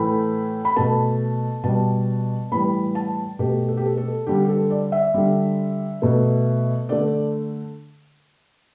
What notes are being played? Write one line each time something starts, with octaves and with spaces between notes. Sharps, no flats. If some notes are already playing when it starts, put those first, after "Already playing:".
Already playing: A2 E3 A3 B5
B5
B2 A3 A5
B2 G3 A5
A2 E3 G3 B5
A5
B2 A3 G4
A4
G4
A4
A4
D3 G3 G4
G4
A4
D5
E5
D3 G3
B2 A3
D3 A3 D5